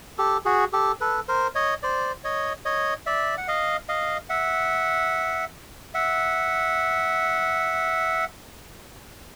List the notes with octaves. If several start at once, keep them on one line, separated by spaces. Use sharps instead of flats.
G4 A4
F#4 G#4
G4 A4
A4 B4
A#4 C5
C#5 D#5
C5 D5
C#5 D#5
C#5 D#5
D5 E5
F#5
D#5 F5
D#5 F5
E5 F#5
E5 F#5